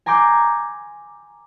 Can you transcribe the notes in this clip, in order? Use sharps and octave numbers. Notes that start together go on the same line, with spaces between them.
G#5 A#5 C6 D6 G6